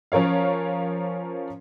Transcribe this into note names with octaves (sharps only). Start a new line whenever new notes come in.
F3 C#4 A#4 C#5 F5